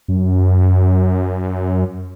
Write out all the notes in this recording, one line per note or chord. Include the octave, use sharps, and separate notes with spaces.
F#2